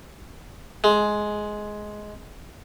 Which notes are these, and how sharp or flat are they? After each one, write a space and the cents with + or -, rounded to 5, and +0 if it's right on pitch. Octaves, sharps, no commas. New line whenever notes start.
G#3 +10